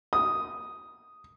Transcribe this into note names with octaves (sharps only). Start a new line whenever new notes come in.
D#6